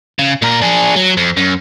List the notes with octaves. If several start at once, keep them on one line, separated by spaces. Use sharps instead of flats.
C#3
A#2 A#4
D4 G#4
F#3
F2
F#2